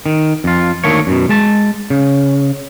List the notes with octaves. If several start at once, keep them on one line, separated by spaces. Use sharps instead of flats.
D#3
F2 F4
D2 D#3 A3 A#3 C#5
F#2 B2
G#3 A5
C#3